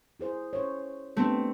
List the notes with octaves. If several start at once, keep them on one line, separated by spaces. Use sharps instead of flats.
E4 G#4 C5
C#4 C5 C#5
A3 B3 C4 D4 G4